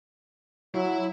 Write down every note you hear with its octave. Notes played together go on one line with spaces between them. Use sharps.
F#3 E4 C#5